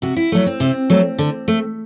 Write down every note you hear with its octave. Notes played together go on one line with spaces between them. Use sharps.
C3 F#4
E4
F#3 A3
C4
C3
F#3 A3
D3
A3